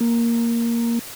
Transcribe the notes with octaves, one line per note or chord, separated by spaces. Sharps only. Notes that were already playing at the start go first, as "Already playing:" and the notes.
A#3